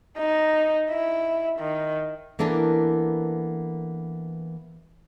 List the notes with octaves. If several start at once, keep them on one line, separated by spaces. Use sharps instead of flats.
D#4
E4
D#3
E3 A#3 B3 D4 A4 A#4